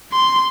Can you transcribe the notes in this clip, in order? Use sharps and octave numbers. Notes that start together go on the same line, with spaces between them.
C6